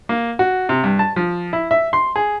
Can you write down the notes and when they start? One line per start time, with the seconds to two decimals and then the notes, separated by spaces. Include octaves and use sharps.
0.09 A#3
0.39 F#4
0.69 C3
0.84 G2
0.99 A5
1.16 F3
1.53 E4
1.71 E5
1.93 C6
2.16 G#4